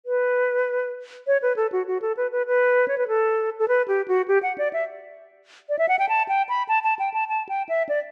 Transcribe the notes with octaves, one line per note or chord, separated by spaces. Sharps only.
B4
C#5
B4
A4
F#4
F#4
A4
B4
B4
B4
C#5
B4
A4
A4
B4
G4
F#4
G4
F#5
D5
E5
D5
E5
F#5
G5
A5
G5
B5
A5
A5
G5
A5
A5
G5
E5
D5